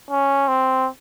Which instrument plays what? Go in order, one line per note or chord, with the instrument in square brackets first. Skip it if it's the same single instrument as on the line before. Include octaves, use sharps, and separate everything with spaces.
[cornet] C#4
C4